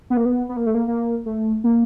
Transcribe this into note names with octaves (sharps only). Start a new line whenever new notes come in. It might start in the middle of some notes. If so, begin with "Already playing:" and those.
B3
A#3
B3
B3
A#3
A3
A#3
A#3
A3
A#3